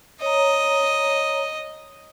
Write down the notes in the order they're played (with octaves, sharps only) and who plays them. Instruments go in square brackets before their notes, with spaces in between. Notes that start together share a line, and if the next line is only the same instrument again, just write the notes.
[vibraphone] C#5 A#5 [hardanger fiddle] D#5